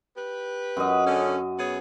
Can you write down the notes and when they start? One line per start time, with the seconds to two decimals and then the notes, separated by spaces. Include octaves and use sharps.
0.16 G4 B4
0.77 F#2 D#5
1.05 D3 C#4
1.58 B3 G#4 C#5